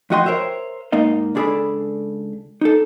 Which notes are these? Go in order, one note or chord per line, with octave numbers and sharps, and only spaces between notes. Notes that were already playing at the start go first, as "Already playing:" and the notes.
F2 A2 F#4 D#5 G5 C6
A#4 C5 C#5 E5
G#2 A#3 D#4 D#5
C#2 D4 G#4 A4 D5 B5
D#4 A4